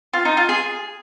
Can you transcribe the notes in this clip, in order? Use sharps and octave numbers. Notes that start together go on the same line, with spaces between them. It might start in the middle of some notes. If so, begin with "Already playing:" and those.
F4
D#4
F4
G#4